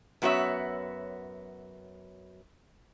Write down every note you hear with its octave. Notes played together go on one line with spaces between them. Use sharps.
F#2 B3 F#4 C#5 E5